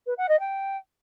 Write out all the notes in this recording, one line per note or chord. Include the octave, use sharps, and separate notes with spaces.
B4
F#5
D#5
G5